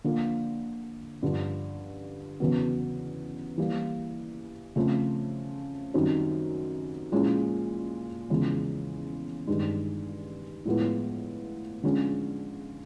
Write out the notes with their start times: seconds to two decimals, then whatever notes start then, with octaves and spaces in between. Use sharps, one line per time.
0.04 D3 F3 A#3
1.22 G2 D3 F3
2.40 E2 C#3 F#3 B3
3.57 E3 G3 A#3
4.76 C#3 F3 A3 C4
5.94 F#2 D#3 G3 C4
7.12 A#2 F3 G#3 C#4 E4
8.30 E2 C#3 F3 G#3
9.47 G2 D#3 G#3
10.65 A2 F3 G#3 B3 E4
11.83 D3 F3 G#3 C#4